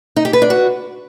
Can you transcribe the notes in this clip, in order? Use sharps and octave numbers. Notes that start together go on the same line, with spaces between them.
D#4
G4
B4
D4
F#4